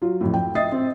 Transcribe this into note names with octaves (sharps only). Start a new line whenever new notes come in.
F#3 F4
F2 A2
G5
D#5 E5 D#6 A6 C7
C4